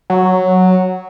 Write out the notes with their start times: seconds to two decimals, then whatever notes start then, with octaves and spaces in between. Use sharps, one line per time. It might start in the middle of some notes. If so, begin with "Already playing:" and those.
0.10 F#3